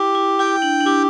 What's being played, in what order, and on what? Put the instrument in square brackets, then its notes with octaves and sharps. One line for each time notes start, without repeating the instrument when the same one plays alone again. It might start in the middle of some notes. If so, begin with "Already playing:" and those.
Already playing: [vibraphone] E4 [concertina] G4
[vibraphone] E4
[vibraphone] E4 [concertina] G5
[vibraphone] D4
D4
[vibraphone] E4 [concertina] G4